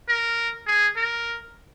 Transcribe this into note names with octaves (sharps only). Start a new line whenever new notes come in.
A#4
G#4
A#4